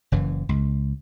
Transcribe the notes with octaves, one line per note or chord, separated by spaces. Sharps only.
F#1 F#2 E3
C#2